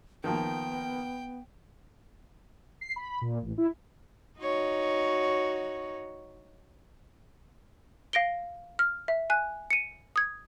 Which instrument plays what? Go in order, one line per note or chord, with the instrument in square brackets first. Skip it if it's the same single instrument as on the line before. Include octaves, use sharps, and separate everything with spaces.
[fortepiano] D#3 F3 A#3 [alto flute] B3 [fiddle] G5
[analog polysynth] C7
B5
B5
A#2
A1
E4
[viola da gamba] D#4 F#4 C#5
[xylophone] F5 A#6 D7 G7
F6
E5
G#5 F#6
C#7 D#7
D#6 G#6